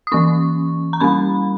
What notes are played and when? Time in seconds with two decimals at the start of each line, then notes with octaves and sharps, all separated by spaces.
0.07 D#6
0.12 E3 A#3 C#4 C#6
0.93 A#5
1.00 G3 A#3 C#4 B5